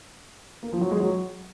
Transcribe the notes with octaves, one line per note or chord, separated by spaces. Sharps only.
A#3
F3
F#3
G#3
F#3